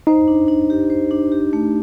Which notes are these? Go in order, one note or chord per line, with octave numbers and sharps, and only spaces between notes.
D#4 C5
D4
D4
G4
C5
D4
G4
A3